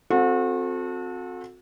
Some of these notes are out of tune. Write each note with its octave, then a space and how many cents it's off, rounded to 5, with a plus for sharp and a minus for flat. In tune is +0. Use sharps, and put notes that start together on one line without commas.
C4 +0 F#4 -35 A4 +0